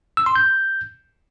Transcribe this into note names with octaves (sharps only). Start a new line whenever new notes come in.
E6
C6
G6